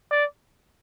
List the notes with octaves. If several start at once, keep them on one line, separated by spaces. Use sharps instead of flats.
D5